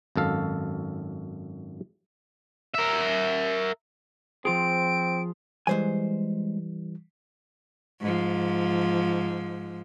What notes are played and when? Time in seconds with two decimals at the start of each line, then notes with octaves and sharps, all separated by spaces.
0.16 G#1 F#2 A4 F5
2.75 A#4 E5
4.45 F3 C4 F4 G#4 D7
5.67 E3 G3 G#3 C5 G#5
8.01 G#2 F3